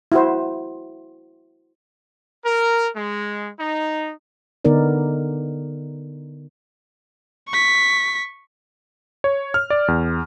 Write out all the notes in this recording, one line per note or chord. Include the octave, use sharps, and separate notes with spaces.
E4 F#4 C5
A#4
G#3
D#4
D3 B3 D#4 A#4 D5
C#6 B6
C#5
F6
D5
E2